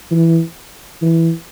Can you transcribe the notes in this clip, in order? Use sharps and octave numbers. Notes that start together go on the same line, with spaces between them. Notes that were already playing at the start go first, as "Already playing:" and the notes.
E3
E3